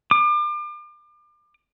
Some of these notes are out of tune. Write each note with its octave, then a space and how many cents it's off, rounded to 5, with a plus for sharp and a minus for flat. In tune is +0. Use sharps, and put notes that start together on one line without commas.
D6 +35